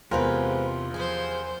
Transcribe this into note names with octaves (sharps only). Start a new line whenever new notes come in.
E2 C3 G#3 C4 F4 A#4 B4 F6
D#2 F3 G#4 C5